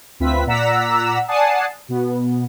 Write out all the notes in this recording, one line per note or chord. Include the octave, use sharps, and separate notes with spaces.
D2 C4 F4 B4 E5 B6
A#2 D5 F#5 A#5 E6 B6
D5 F#5 G#5 A5 D#6 C7
B2 B3